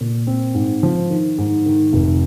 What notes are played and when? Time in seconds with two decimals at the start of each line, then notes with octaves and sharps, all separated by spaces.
0.01 A#2
0.27 C4
0.55 G#2
0.83 F3
1.10 D#3
1.38 G#2
1.66 D#3
1.93 F1